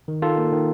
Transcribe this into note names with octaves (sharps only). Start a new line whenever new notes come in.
D#3
D#3 F4 A4
A#3
D#3